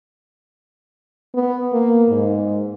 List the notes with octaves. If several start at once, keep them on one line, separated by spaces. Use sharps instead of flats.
B3
A#3
G#2